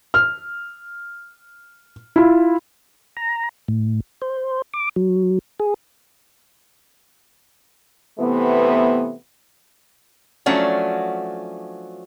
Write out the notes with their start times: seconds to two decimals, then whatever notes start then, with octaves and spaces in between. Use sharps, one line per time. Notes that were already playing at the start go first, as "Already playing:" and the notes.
0.14 F6
2.16 E4 F4
3.17 A#5
3.68 A2
4.22 C5
4.74 D6
4.96 F#3
5.60 G#4
8.19 C3 E3 A3 B3
10.46 F3 F#3 A3 C#4 D4 F#4